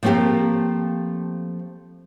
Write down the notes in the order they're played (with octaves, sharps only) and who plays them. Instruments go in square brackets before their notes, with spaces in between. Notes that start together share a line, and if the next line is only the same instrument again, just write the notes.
[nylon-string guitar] F3 A3 A#3 C4 G4 A#4